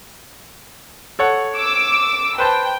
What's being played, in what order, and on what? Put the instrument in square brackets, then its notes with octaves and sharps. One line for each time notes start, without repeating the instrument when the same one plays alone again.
[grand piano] A4 C#5 F#5
[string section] D6 E6
[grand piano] B4 C5 A5 [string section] G5